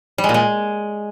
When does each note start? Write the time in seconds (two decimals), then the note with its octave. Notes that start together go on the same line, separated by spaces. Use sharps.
0.18 G3
0.24 G#3
0.29 A#2
0.34 G#3